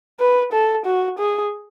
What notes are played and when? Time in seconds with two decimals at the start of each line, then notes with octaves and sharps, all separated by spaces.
0.20 B4
0.52 A4
0.85 F#4
1.18 G#4